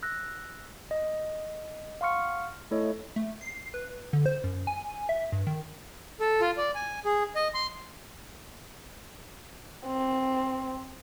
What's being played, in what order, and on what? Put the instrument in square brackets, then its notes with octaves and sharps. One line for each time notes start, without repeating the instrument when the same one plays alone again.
[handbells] E6 F#6 A#6
D#5
F5 F#5 C6 C#6 F6 C#7
A3 E4 A4 C#5 D#5
[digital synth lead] A3
C7
B4
D3
C5
F#2
G#5
E5
G2
D#3
[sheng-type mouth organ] A4
F4
D5
G#5
G#4
D#5
C6
[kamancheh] C4